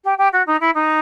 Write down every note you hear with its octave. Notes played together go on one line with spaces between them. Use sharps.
G4
G4
F#4
D#4
E4
D#4